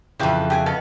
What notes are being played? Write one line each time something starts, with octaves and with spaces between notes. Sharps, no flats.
F2 C#3 E3 F3 G4 A4
E3 G4 G#4 G#5
B3 A4 D#5 F5